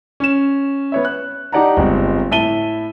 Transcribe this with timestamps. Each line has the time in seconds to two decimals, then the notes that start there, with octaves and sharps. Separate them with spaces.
0.20 C#4 E7
0.92 B3 C#5 E5
1.05 F#6
1.52 D#4 G4 D5 F#5 A5 A#5
1.77 G1 G#3 C4
2.31 A2 E5 A5 D#7 G7